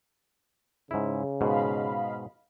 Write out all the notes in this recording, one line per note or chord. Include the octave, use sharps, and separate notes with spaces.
G#2 C#3 E4
G#2 B2 D#5 F5 B5